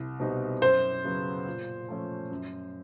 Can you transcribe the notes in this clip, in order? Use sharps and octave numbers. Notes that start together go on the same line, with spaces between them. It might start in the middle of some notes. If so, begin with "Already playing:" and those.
Already playing: C2
B2 G3 C4 D#4
F#2 C5
C#3 F#3 B3
A#2
F3 A3 C#4
F#2